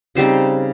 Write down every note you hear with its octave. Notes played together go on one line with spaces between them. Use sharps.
C#3 G3 C4 D#4 C5